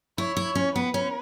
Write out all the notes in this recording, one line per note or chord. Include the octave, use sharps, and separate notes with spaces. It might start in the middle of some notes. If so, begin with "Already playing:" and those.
E4 C#5
E4
C#4
B3 B4
C#4